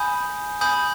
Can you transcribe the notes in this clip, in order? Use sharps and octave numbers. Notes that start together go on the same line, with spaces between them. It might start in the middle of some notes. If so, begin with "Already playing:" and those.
Already playing: G#5 B5 D#6 G6
G#5 B5 D#6 G6